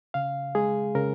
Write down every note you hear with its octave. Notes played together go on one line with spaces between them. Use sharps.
C#3 F5
G#3 G#4
C#3 A#4